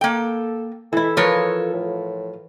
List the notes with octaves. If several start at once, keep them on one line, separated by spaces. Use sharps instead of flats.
A#3 A4 G5
E3 E4 A4
F3 F4 A#4 B4 C#5
A2